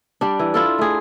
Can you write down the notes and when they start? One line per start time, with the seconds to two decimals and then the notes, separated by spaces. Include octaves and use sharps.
0.21 G3 D4
0.39 E3
0.54 E4 F4 A4
0.79 A3 G#4